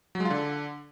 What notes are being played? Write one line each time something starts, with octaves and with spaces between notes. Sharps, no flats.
F#3
G#3
F4
D3